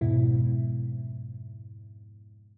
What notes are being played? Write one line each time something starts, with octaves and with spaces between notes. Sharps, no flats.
F2 G#2 B2 E4